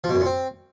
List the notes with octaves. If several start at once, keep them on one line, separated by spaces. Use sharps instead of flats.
F3
B2
F#2
A#2
C4